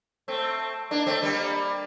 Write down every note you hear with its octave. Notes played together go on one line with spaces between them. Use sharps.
A3 C4
A#3 D4
A3 C4
G3 A#3